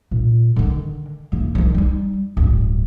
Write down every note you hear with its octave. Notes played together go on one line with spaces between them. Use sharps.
A#2
D3 D#3
E2 A#3
D#3 F3
G3 D#4
D1 G2